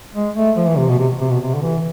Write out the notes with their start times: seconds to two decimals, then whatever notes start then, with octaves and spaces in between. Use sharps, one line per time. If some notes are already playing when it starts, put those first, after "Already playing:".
0.15 G#3
0.36 A3
0.57 F3
0.67 E3
0.78 C3
0.88 B2
0.99 C3
1.20 C3
1.31 B2
1.42 C3
1.55 D3
1.62 E3